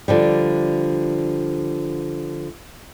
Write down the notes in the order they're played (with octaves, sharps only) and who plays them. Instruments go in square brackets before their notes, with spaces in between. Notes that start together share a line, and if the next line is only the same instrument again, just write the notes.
[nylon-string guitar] D3 F3 G3